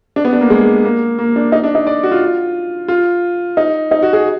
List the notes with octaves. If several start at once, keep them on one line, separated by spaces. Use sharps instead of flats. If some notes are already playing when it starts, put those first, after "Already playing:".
D4
B3
D4
A#3
G#3
A#3
A#3
D4
D#4
D4
D#4
D5
F#4
F4
F4
D#4
D#4
F#4
G#4